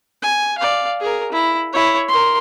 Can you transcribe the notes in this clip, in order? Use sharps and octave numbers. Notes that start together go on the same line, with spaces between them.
G#5
D5 F5
G#4 A#4
E4
E4 C#5
A#4 C6